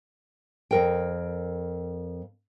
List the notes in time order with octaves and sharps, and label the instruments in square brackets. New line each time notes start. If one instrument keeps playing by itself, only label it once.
[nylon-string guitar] F2 A#4 G5